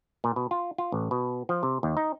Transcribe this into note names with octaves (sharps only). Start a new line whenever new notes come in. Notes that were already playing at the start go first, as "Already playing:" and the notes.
A#2
B2
F4
F4
A1
B2
F3
C3
D#2
D#4